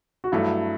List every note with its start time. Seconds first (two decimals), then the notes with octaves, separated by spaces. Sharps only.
0.24 F#4
0.32 G2 F#3 A3 E4